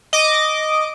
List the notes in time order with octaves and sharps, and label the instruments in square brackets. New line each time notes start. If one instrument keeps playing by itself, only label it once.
[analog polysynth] D#5 D6